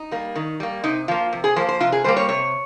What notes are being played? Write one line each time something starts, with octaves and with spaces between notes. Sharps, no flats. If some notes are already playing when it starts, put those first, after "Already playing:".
Already playing: D#4
G3 A#3
D#3
G3 A#3
C3 D#4
F3 A#3 F4
C3
G#4
F3 A#3 C5
C5
C3 F4
G#4
G3 A#3 C5
C#5
C3 C#5